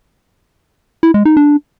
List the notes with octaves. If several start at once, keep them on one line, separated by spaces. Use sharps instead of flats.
E4
G#3
D#4
D4